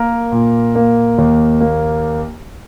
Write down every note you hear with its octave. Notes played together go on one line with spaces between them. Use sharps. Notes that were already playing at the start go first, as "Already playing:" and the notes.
Already playing: A#3 A#4
A#2
A#3
D#2
A#3